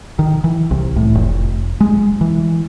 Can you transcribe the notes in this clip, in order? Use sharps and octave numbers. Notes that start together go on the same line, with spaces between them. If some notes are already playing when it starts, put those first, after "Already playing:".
D#3
E3
C2
A2
F1
G#3
E3